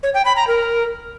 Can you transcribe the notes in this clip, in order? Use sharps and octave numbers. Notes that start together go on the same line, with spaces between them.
C#5
G5
B5
A#5
A#4